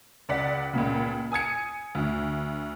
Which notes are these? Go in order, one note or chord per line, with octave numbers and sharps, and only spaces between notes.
C#2 D5 F#5 B6
C#2 A#2 C#3
G#5 D#6 G#6 C#7
D2